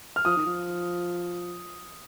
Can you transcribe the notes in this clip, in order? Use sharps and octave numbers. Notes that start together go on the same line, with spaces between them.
F6
F3 D#6
D#3
F3